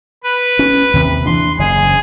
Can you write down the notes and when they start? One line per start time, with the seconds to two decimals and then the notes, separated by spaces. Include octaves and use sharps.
0.24 B4
0.59 C#4
0.94 D#2 C3
1.26 E3 D4 C6
1.59 F#1 C#3 G#4